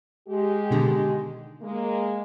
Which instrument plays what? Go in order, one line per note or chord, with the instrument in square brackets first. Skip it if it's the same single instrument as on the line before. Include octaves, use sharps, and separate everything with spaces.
[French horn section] G#3 G4
[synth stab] B2 D3 D#3
[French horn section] G#3 A#3